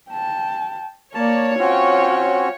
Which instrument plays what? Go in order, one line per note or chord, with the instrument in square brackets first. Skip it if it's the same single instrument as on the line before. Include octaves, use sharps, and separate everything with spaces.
[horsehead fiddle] G5 A5
[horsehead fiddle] A#3 D5 [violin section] C#5 [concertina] A5
[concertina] C4 C#4 F#4 [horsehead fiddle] F4 G5